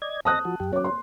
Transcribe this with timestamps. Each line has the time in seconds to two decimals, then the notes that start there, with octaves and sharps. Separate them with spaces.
0.02 D5 D#5 G#6
0.25 D#5 A5 D#6 F#6 A#6
0.45 F3 F#4
0.60 F#2 G4
0.73 F#3 C#4 C#5 D6
0.84 C6